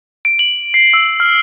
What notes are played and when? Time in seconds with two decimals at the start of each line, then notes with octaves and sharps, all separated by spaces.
0.25 D7
0.39 F#7
0.74 C7
0.94 E6
1.20 F6